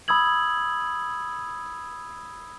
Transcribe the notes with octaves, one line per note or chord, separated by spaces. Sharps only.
B5 D#6 E6 G#6 F#7